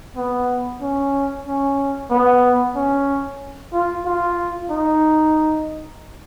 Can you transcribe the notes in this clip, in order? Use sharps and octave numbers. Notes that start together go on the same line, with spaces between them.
B3
C#4
C#4
B3
C#4
F4
F4
D#4